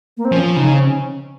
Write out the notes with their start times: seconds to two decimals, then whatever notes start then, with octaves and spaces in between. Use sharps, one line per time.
0.17 A#3
0.25 C4
0.32 F3 C#4
0.56 C#3 D#4
0.74 C4
0.80 C#4